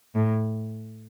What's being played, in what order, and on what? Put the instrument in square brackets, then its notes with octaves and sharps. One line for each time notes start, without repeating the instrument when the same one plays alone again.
[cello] A2